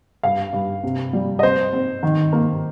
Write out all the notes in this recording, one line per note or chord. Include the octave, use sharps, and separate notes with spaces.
G2 F5
G2
C3
G3
D#5
C4 C5
C4
D#3
A#3